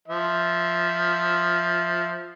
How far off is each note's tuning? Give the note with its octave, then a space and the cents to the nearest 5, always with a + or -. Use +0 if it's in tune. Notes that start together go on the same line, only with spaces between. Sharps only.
F3 +0 E5 -5